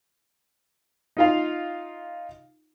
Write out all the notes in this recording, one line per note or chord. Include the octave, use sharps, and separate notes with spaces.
D#4 F4 F5